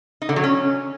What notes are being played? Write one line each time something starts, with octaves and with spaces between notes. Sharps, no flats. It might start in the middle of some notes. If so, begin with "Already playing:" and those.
D#4
D3
F#3
C#4